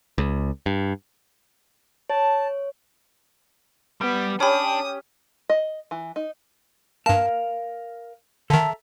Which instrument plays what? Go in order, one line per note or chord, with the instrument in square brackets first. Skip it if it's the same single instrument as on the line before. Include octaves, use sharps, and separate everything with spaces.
[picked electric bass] C#2
G2
[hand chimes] C#5 [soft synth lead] A5
[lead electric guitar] G3 [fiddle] B3
[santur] C#4 G4 [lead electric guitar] D4 [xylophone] C#5 B5 [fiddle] D#6
[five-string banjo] D#5
E3
D#4
[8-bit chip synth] G2 A5 [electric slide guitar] A#4 F5
[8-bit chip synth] D3 D#3 [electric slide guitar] A4 E5 A#5